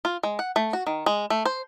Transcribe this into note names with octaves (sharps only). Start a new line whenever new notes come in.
F4
G#3
F#5
A3
F#4
D#3
G#3
A3
C5